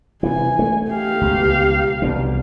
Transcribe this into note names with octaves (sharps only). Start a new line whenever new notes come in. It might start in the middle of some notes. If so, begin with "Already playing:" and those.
C3 E3 G#5
A3
G4 F5
C#2 B2
C2 B2 D3